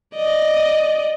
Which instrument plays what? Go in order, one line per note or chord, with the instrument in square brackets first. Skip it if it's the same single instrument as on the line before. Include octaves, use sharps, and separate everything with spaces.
[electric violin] D5 D#5